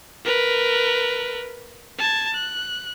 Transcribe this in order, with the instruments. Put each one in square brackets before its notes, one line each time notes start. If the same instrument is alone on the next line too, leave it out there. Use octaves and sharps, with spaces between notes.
[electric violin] A#4 B4
A5 G#6
F#6